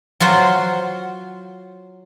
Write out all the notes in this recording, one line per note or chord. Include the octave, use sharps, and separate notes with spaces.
F#3 F4 C5 F#5